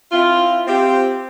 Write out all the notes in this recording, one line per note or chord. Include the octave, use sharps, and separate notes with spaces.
C4 E4 F4
C4 F4 G4 C5